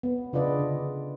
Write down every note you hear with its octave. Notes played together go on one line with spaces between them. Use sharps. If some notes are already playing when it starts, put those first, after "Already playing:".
B3
C#3 D4 F4 B4 D5 D#5
D3